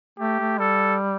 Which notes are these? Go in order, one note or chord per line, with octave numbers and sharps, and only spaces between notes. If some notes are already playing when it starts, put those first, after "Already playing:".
A3 G4
A3
G3 A4